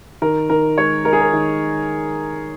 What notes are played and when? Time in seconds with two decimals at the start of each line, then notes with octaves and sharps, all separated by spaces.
0.22 D#3 A#4
0.50 D#3 A#4
0.77 G#3 C#5
1.05 G#3 A#4
1.13 G#4
1.21 A#4
1.33 D#3